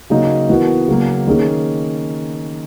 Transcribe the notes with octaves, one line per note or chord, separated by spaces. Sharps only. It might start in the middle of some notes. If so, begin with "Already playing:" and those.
C#3 F#3 A#3 D#4 F#4
E3 B3 F#4 A#4
C#3 F#3 A#3
D#3 A#3 C#4 G#4